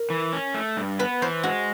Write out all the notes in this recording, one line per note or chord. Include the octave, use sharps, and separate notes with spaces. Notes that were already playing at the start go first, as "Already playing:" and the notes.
Already playing: A#4
E3
C#4
A3
G2
B3 B4
E3 C5
G#3 F#4